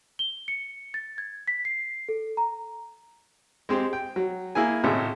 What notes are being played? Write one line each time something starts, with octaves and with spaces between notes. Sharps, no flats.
G7
C#7
A6
G#6
B6
C7
A4
A#5
G#3 C4 G4 C5
G5
F#3
A#3 E4 G#4 G#5
G#1 A2 C#3 E5